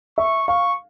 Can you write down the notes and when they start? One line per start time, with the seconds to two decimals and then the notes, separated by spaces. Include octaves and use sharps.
0.18 E5 C#6
0.48 F5 C#6